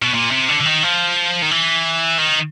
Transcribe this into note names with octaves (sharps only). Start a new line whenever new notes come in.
B2
A#2
C3
D3
D3
D#3
F3
D#3
E3
D#3